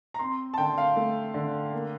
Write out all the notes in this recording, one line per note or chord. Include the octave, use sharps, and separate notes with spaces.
A#5
C4 C6
A5
D3 G5
F5
A3
D3
A#3